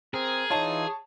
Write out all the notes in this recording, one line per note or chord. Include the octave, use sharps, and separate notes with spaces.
C4 G#4 A#4
E3 D#4 F4 C#5 A5